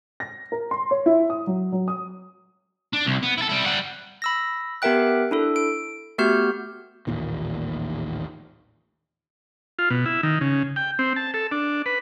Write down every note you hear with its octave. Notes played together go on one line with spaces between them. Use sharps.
A#6
A#4
C6
C#5
E4
D#6
F#3
F#3
D#6
D4
C2
B3
E4 A4
G3 E4
G3 F#5
B5 E6 A#6
B3 G4 A#4 E5 G5 F#6
D4 E4 A4
D7
A3 B3 F#4 G4 F6 G6
A1 D#2 A#2 D#3
F4
B2
E4
D#3
C#3
G5
C4
A5
A4
D4
B4